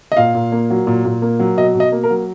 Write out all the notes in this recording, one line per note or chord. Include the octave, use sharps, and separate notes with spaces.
D#5
A#2 F5
A#2
A#3
F#3
A#2
A#2
A#3
F#3
B2 D#5
B2
D#5
A#3
A#4
F#3